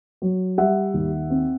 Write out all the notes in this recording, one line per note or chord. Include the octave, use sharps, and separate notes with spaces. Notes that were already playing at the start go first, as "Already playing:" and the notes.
F#3
G3 E5 F#5
D#2
C4